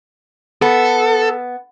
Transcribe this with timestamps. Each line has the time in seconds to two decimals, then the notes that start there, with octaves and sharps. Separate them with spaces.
0.62 B3 A4